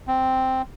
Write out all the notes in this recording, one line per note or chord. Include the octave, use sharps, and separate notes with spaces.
C4